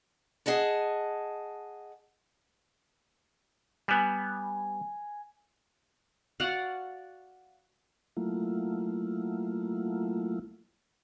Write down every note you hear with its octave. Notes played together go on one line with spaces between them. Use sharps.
G#4 D#5 F#5 A5
G3 B3 G#5
F#4 D5 F5 F#5
F#3 A3 A#3 E4 F4